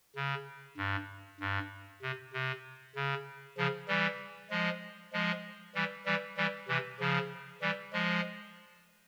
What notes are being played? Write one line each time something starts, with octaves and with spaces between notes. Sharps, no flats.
C#3
G2
G2
C3
C3
C#3
C#3 F3
E3 G3
F3 G#3
F3 G#3
E3 G3
E3 G3
E3 G3
C3 E3
C#3 F3
E3 G3
F3 G#3